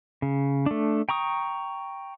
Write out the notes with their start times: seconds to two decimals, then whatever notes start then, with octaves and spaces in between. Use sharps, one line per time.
0.22 C#3
0.66 A3 D4
1.09 G5 A#5 C#6 D#6